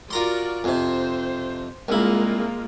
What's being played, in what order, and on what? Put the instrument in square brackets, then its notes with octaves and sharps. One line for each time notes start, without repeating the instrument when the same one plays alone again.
[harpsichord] F4 A#5 C6 [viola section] F#4 A#4 D5
[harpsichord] F2 C3 [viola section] C5
[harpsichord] C2 E4 [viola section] G#3 A#3 F4